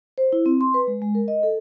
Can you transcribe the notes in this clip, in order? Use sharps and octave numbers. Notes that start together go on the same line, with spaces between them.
C5
E4
C4
C6
B4
G#3
G#3
A#4
D#5
A4